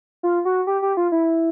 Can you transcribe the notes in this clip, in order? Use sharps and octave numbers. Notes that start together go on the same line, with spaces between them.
F4
F#4
G4
G4
F4
E4